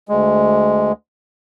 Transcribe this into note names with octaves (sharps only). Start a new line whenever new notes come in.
D2 G#3